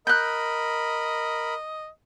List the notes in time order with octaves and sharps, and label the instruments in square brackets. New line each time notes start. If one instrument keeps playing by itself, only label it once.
[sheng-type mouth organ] A#4 B5 [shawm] D#5 [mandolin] F#6 G6